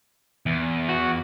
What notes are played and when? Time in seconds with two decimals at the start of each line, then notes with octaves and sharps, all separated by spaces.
0.46 E2
0.89 F#4